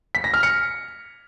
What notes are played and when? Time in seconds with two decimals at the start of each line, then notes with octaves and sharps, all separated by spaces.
0.15 B6
0.24 A#6
0.34 F6
0.43 C#7